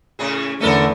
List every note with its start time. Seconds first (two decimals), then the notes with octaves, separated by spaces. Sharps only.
0.19 A2 C#3 G#4
0.60 E2 D3 A3 C#4 A4 A#4 D#7